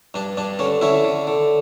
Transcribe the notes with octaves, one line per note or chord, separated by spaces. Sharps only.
G2 D4
G2 D4
D3 C#4
D3 C#4 E4
D3
D3